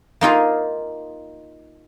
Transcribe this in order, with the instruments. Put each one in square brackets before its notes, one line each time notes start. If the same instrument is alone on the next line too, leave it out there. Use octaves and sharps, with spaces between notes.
[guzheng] A#3 D#4 F4 G#4